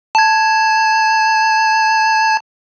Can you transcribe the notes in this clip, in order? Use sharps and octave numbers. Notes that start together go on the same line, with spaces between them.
A5 G#6